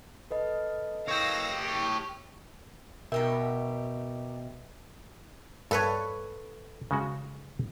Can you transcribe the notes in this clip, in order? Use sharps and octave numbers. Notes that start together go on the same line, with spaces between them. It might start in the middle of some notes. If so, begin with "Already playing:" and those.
A4 B4 D#5
C#5 F5 G5 E6 A#6
G4
B2 D#4 G4 A#4 E5 G5
G2 A4 B4 C#5
C#3 G#3 F#4